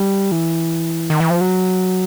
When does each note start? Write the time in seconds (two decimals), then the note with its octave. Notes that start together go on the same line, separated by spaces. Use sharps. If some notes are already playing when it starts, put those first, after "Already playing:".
Already playing: G3
0.32 E3
1.10 D#3
1.20 E3
1.30 F3
1.41 F#3